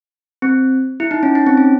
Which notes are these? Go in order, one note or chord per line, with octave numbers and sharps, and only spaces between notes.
C4
E4
D#4
C#4
D#4
C4
C#4